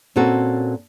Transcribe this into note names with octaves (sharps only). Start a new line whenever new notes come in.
A#2 C4 C#4 F#4 A4